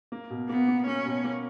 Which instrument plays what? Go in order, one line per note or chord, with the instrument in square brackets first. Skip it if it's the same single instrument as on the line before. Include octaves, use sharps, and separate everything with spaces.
[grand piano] A#3
B2
[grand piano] A#3 [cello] B3
[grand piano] A#3
[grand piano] A#3 [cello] C#4
[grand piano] B2
A#3